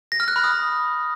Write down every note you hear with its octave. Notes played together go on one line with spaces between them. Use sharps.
A#6
F6
F#6
B5
D#6